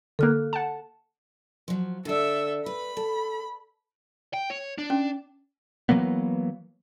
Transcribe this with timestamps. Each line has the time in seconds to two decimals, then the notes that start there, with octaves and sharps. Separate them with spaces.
0.19 D3 A#3 A4 F6 F#6
0.53 F#5 A5
1.68 F3 F#3
2.05 D3 A4 D5 E5
2.66 B4 B5
2.97 A4
4.33 G5
4.50 C#5
4.78 D4
4.90 C#4
5.89 E3 F#3 A#3 B3